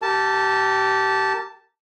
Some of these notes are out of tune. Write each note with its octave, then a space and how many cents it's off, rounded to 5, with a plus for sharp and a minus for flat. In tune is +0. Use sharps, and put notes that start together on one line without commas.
G4 -20 A#4 -40 A5 +0